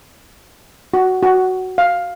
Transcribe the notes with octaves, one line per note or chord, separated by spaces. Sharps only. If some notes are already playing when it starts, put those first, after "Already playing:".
F#4
F#4
F5